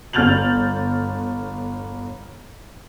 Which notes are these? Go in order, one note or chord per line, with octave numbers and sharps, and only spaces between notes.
G1 F6 G6 A6 F7 F#7